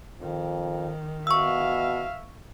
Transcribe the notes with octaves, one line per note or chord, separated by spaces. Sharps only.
F2 D#3
B2 E5 F5 C#6 E6